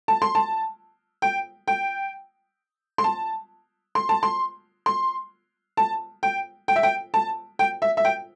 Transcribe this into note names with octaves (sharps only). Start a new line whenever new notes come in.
A5
C6
A5
G5
G5
C6
A5
C6
A5
C6
C6
A5
G5
G5
E5
G5
A5
G5
E5
E5
G5